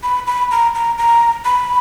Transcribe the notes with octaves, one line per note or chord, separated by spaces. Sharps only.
B5
B5
A#5
A#5
A#5
B5